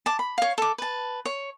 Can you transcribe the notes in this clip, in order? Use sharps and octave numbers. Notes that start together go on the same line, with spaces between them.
A5 D6
B5
C#5 F5
A4 D6
B4 A5
C#5